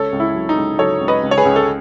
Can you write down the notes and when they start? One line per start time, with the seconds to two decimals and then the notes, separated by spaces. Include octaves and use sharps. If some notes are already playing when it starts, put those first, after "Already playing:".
Already playing: C#2 A4 C#5
0.12 C#2
0.20 E4
0.35 F#3
0.49 D#4
0.56 C#2
0.78 F#3 A4 C#5
1.01 C#2
1.08 B4 D#5
1.23 C#2
1.31 C#5
1.38 G#4 B4
1.45 C#2
1.56 A4